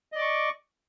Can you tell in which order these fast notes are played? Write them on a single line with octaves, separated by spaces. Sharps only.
D#5 D5 D6 C#6